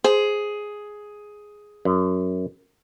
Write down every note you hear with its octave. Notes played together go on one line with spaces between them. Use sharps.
G#4 C5
F#2